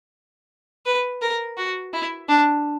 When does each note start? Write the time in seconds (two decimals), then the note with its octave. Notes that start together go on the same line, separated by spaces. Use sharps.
0.86 B4
1.22 A#4
1.57 F#4
1.93 E4
2.29 D4